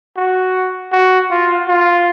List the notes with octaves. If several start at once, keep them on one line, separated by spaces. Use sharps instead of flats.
F#4
F#4
F4
F4